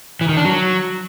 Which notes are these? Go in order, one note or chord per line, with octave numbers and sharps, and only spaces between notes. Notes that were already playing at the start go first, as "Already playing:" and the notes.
E3
D#3
D4
F#3